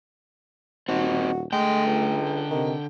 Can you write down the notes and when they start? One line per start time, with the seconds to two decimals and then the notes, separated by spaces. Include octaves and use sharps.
0.89 D#1 C4 D#4 F#4
1.52 D3 G#3 A3 G5
1.86 C#2
2.51 C3 D#3